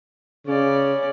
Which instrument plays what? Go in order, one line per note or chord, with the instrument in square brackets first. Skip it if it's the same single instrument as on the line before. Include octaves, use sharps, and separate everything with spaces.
[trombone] C#3 [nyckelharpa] C#4 D5